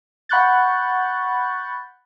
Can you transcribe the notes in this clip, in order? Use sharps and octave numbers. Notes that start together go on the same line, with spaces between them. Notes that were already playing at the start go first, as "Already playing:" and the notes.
F#5 B5 C#6 F#6 G6 A6